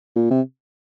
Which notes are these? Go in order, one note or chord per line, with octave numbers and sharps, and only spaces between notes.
A#2
C3